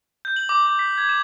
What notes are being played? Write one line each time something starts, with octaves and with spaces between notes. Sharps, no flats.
G6
F#7
D6
D6
B6
G#6
E7